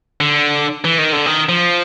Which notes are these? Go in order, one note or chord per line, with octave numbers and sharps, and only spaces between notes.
D3
E3
D#3
D3
D#3
F3